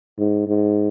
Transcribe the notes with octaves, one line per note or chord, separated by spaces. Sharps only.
G#2
G#2